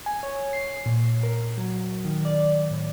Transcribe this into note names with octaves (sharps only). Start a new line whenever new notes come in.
G#5
C#5
C7
A#2
A#4
F#3
D#3
D5
A2